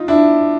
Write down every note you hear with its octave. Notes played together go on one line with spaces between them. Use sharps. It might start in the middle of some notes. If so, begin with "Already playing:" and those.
Already playing: D#4 F4
D4 E4